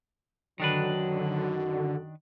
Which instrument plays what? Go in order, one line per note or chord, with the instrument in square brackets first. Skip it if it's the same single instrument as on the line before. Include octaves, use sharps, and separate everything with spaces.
[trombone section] F#2 D#4 F#4 [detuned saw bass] D3 [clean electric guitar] D#3 D4 B4 [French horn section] F#3